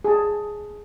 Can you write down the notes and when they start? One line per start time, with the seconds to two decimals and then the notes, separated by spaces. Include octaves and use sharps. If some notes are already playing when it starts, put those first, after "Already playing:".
0.05 G#4 A5